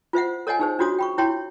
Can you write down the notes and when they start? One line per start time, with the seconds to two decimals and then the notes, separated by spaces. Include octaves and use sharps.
0.13 F4 C5 E5 F#5
0.47 A4 C#5 D#5 F#5 G#5
0.59 D#4 G#4 C5
0.79 D4 F4 F#4 C#5 D#6
0.99 G5 B5 C#6
1.18 E4 C#5 G5 C6